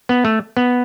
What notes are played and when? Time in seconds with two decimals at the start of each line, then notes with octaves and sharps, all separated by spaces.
0.09 B3
0.25 A3
0.57 B3